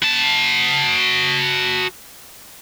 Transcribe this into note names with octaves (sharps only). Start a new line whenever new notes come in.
F#4 A5